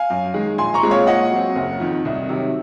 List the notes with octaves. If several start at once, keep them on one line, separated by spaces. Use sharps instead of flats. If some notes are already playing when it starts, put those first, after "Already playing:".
Already playing: F5 G#5
F#2
D#3 G#3
A#1 G#5 C6
A#5 C#6
A#2 G#3 C4
C#5 F5
A#2 D#5 F#5
F#3 C4
F#1
F2 D#3
C2
C3 D#3 F#3